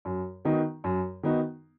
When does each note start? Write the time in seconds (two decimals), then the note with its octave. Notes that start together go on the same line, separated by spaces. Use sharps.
0.05 F#2
0.45 D#3 B3 D#4 F#4
0.84 F#2
1.23 D#3 B3 D#4 F#4